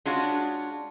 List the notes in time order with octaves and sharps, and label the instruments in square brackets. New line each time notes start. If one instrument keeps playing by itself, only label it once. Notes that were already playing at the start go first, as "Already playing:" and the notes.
[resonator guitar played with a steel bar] G#3 C#4 D4 F4 F#4